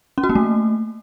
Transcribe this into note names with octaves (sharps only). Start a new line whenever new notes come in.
C#4
F#4
A#3
A3